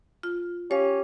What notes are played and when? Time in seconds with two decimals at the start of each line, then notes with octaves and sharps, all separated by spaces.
0.23 F4
0.71 C#4 G4 C#5 F5